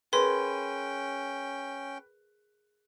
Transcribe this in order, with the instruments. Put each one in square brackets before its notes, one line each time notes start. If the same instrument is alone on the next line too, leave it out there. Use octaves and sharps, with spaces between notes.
[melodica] C#4 G5 [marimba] G#4 A#4 [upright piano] B4 [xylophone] C6